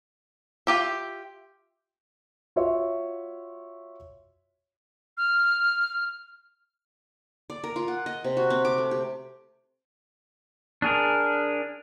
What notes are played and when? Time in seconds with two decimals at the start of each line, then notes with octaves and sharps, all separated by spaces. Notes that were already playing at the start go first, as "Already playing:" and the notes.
0.67 F4 G4 E5
2.56 F4 F#4 C#5 E5
5.17 F6
7.50 D5
7.64 A#4
7.76 F4
7.88 F#5
8.06 D#5
8.24 C3
8.37 F#4
8.50 C4
8.65 D6
8.78 A3
8.91 G4
10.82 D4 G#4 A#4